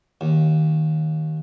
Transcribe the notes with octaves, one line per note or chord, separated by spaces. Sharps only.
D#2